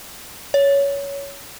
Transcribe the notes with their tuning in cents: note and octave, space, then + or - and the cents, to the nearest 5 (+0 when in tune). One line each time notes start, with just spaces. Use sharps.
C#5 +15